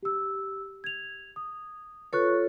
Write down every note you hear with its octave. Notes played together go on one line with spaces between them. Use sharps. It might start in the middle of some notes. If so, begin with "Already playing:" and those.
G4 E6
G#6 F7
D#6
F4 A4 B4 C#5 C#6 F#6